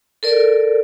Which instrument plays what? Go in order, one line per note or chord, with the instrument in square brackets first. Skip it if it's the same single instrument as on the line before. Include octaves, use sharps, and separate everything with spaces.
[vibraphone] A4 A#4 D5